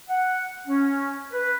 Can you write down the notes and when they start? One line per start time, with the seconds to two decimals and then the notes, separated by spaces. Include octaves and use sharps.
0.10 F#5
0.67 C#4
1.32 B4